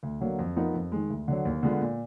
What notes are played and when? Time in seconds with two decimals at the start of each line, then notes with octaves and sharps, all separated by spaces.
0.03 D2
0.21 D3 F#3 A#3
0.39 F2
0.56 F3 B3 D#4 A#4
0.74 F2
0.92 D#3 G#3
1.10 D2
1.28 D3 F#3
1.45 D#2
1.63 D3 G#3 B3 F4
1.81 A#2